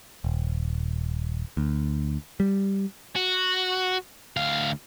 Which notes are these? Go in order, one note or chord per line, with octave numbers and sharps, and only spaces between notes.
D#1
D2
G3
F#4
D2 F5